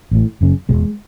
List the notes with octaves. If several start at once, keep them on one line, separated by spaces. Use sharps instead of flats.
A1 A2
F#1 F#2 C#3
E1 E2 B2 G#3